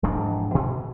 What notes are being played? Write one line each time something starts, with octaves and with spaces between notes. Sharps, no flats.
E1 G#2 F3 D4
B2